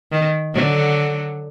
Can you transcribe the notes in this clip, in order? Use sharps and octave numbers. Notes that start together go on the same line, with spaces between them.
D#3
D3 F#3